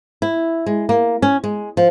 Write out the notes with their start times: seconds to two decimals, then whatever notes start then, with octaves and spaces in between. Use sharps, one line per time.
0.22 E4
0.66 G#3
0.89 A#3
1.22 C#4
1.44 G#3
1.77 F3